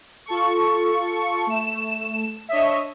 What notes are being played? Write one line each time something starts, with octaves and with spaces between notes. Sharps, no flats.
F4 A4 C#6
A3 E7
D4 C#5 D#5 E5